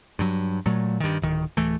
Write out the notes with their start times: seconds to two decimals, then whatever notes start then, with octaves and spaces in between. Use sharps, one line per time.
0.19 G2 F#3
0.66 A#2 F#3 A3
1.00 G2 D#3
1.22 D1 D#3
1.57 D1 E3 A3